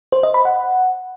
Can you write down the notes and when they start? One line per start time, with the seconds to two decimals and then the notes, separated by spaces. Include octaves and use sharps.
0.12 C5
0.23 D#5
0.34 B5
0.45 F#5